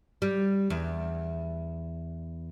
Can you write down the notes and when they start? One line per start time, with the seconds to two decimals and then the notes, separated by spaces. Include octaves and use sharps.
0.22 G3
0.70 E2